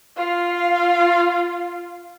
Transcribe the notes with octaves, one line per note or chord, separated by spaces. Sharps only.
F4 F5